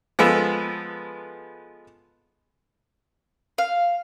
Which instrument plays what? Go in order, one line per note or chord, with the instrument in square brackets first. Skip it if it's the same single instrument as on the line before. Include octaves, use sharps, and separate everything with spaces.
[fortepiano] F3 G#3 B3 A4
[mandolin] F5